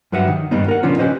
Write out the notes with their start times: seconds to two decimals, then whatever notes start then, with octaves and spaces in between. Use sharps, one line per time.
0.12 G2 F#3 B4 E5 F#5
0.27 D#3
0.51 G2 G3 A#3 B3 D#4
0.68 A#4 F#5
0.83 C#3 F3 B3 C#4 D4 F4
0.98 C#4 G4 B4 C5 D#5